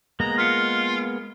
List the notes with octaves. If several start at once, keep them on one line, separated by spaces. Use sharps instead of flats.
G#3 A#3 B3 A#5
F4 F6 B6 C#7